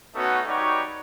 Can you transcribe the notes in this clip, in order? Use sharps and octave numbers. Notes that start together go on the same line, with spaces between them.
A3 B3 C#4 D#4 F#4
G3 D#4 F#4 B4 C#5 D6